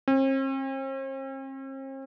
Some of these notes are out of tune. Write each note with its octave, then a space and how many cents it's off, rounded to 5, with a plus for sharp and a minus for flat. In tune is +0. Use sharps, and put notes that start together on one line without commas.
C4 +45